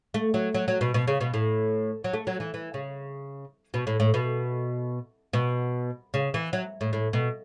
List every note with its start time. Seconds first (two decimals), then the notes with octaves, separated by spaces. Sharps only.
0.14 A3
0.34 F#3
0.54 F#3
0.68 F#3
0.81 B2
0.94 B2
1.08 C#3
1.21 B2
1.34 A2
2.04 F#3
2.13 A3
2.27 F#3
2.40 E3
2.54 E3
2.74 C#3
3.74 B2
3.87 A2
4.00 A2
4.14 B2
5.33 B2
6.14 C#3
6.34 E3
6.53 F#3
6.81 A2
6.93 A2
7.13 B2